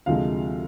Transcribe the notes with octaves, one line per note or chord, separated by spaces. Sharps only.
D2 C3 F3 G#3 F5